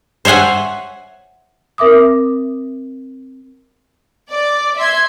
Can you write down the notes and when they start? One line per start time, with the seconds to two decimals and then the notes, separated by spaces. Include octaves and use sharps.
0.25 C5 C#5 E5 F#5 G#5
1.78 C4 A#4 E5 D6 D#6
4.30 D5
4.77 E5 C6 G#6